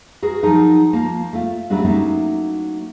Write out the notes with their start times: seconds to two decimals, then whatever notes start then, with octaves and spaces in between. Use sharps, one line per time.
0.22 F#4 G#4 A#4
0.43 F3 F#3 D#4 G#4 A#4
0.93 F3 A#3
1.33 A3 F4
1.70 F#3 G3 A3 C#4 D4 F#4
1.84 F#3 A3 A#3 C#4 D#4 E4